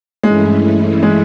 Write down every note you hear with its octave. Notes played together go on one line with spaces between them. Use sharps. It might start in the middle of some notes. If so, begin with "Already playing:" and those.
G2 E3 G#3 A3 C#4 E4
G#3